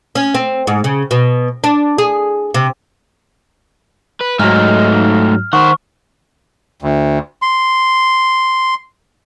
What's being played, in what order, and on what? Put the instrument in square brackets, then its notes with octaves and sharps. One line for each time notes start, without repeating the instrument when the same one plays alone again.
[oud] C#4
C4
G#2
C#3
B2
D4
G#4
C3
[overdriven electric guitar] B4
[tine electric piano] G#2 F#3 [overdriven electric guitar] A3 D#4 [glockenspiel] F6
[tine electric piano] D#3 [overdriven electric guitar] C5 F#5 [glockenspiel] C#6
[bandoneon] D2
C6